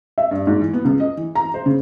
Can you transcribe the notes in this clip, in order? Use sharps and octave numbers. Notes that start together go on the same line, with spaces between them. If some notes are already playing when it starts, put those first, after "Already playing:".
E5
G2
G#2
E3
B3
C#2
D#5
E3
A#5
C5
C#3